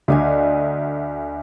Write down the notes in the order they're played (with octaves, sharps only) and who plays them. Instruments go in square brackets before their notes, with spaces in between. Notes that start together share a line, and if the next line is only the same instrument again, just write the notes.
[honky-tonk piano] D2 [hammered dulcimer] D5 D#5 G#5